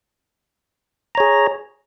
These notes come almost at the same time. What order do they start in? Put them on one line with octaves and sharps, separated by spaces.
A#5 C#5 G#4